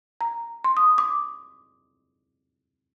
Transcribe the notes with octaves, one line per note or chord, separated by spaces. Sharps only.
A#5
C6
D#6
D6